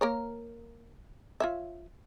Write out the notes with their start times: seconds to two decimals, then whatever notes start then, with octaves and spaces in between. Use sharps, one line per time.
0.01 A#3 A#4 C#5
1.40 F4 C#5 E5